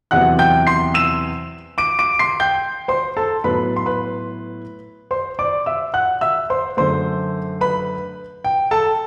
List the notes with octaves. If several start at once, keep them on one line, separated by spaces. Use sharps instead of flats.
E2 C3 F#3 B3 F#5 F#6
G5 G6
C6 C7
E6 E7
D6 D7
D6 D7
C6 C7
G5 G6
C5 C6
A4 A5
A2 F#3 B3 B4 B5
C6
B4 B5
C5 C6
D5 D6
E5 E6
F#5 F#6
E5 E6
C5 C6
F#2 D3 A3 C5 C6
B4 B5
G5
A4 A5